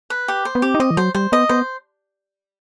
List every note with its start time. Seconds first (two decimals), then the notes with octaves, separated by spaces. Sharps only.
0.10 B4
0.28 G4
0.45 C5
0.55 B3
0.62 C4 G4
0.74 D#4
0.80 C4 D#5
0.91 E3
0.97 F#3 C5
1.14 G3 C5
1.32 B3 D#5
1.49 B3 C5